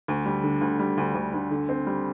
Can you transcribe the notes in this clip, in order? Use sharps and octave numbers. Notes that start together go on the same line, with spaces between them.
D2
G3
D3
D2
G3
D2
D2
D2
D3
C4
G3